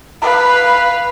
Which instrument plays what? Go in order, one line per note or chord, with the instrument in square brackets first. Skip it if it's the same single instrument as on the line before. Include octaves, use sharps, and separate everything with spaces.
[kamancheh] B4 F5